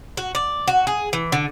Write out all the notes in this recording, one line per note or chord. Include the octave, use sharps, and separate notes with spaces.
F#4
D5
F#4
G#4
E3
D3